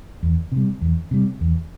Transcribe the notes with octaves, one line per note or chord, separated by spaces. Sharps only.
E2
C3
G3
E2
C3 G3
E2